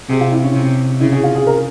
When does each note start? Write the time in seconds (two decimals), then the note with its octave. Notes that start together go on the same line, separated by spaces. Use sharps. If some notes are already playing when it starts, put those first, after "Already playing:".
0.09 C3 G#4
0.21 F4
0.32 E4
0.43 C#4
0.54 C3
1.00 C#3 E4
1.12 G#4
1.23 F4
1.35 G#4
1.47 A#4